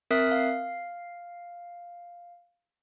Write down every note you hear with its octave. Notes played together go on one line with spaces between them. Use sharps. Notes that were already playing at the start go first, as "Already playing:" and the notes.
C4 A#4 E5 D#6 F#6 B6
F5